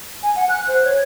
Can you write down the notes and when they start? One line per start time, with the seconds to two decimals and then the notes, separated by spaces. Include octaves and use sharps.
0.23 G#5
0.36 F#5
0.49 F#6
0.68 C5
0.84 C#5